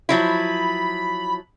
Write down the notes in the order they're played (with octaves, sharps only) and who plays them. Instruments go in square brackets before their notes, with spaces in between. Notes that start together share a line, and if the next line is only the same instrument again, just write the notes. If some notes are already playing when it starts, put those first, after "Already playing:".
[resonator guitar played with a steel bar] F3 F#3 E4 [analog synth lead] B5